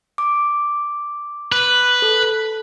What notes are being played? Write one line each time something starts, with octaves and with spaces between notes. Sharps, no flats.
D6
B4
A4